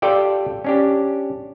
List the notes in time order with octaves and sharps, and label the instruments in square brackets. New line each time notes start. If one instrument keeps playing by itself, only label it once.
[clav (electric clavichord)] F4 G4 A4 D5 G5
C#4 D4 G4